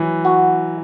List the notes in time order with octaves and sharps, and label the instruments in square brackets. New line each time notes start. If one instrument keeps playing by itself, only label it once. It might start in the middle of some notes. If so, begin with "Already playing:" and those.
Already playing: [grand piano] E3 F#3
[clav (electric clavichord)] F#4